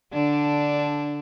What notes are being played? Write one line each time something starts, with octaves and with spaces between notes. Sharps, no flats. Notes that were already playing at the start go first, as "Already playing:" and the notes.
D3 D4